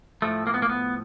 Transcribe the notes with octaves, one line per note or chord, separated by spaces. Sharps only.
A2 F3 A3
A#3
B3
A#3
B3